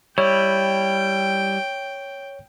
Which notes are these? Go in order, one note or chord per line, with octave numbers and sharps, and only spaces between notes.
G3 E4 C#5 G5